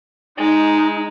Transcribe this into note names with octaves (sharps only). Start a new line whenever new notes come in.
G#3 D#4